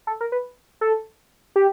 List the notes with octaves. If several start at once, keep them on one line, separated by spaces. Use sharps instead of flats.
A4
A#4
B4
A4
G4